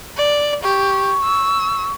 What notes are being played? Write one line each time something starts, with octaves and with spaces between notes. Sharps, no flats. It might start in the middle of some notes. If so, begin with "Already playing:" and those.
D5
G4 C#6
E6